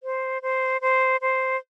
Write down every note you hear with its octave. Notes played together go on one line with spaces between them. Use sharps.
C5
C5
C5
C5